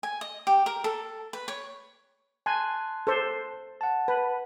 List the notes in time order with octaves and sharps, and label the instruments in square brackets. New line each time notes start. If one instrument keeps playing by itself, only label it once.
[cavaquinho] G#5
D#5
G4
A#4
A4
B4
C#5
[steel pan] G#5 [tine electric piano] A5 C6 F#6
[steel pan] A4 C5
[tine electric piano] F#5 A5
[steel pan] B4